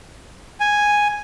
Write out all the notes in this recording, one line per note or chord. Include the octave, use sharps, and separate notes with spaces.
G#5